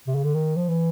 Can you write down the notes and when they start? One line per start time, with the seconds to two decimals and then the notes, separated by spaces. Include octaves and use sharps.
0.07 C3
0.15 C#3
0.24 D3
0.34 D#3
0.56 F3
0.68 E3